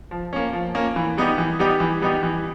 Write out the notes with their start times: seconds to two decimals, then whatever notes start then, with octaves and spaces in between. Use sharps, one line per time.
0.11 F3
0.33 A#3 C#4
0.53 F3
0.75 A#3 C#4
0.96 E3
1.17 G3 B3 D#4 G4
1.38 E3
1.59 G3 B3 D#4 G4
1.80 E3
2.02 G3 B3 D#4 G4
2.23 E3